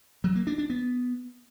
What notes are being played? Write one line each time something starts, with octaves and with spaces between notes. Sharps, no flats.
F#3
A#3
D4
D4
B3